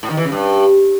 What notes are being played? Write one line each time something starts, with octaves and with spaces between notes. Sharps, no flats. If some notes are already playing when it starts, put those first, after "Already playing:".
A2
D#3
E3
C#3
G2